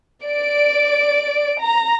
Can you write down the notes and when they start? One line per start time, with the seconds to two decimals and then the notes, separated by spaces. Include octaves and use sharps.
0.24 D5 D7
1.61 A#5